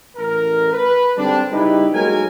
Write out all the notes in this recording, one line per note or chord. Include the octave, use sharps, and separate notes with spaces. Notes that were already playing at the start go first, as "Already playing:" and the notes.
A1 A#4
B4
G#2 D3 G3 C4 D4
C#3 G3 D#4 E4 G4 B4
B1 F#3 G#3 A#3 A#4 G#5